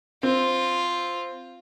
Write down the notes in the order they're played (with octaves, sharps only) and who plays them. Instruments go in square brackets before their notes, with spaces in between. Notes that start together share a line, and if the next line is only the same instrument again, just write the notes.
[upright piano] C4 [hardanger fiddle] F4